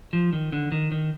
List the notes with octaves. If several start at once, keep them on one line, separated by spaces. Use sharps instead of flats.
F3
D#3
D3
D#3
D#3